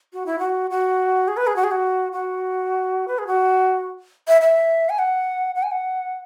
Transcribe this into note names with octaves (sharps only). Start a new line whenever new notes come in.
F#4
E4
F#4
F#4
G#4
B4
G#4
F#4
G#4
F#4
F#4
B4
G#4
F#4
E5
E5
G#5
F#5
F#5
G#5
F#5